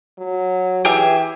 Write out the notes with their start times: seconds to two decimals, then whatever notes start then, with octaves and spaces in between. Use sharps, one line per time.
0.18 F#3
0.85 E3 G4 G#4 E5